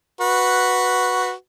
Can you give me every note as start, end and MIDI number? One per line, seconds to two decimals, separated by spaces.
0.20 1.32 66
0.20 1.32 71